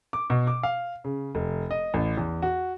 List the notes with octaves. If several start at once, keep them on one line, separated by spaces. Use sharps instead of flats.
D6
B2
D6
F5
C#3
F1
D#5
A1
E2
F#4